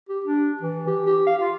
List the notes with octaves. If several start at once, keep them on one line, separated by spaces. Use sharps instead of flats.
G4
D4
E3
G4
G4
F5
F4